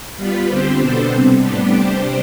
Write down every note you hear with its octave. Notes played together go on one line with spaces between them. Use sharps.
G3 B3 F4 B4
D3 G3 C4 G4 C5
B2 B3 D4 A4 C5
C3 G3 C4
A2 G3 B3 D4 G4
C3 G3 D4 G4 C5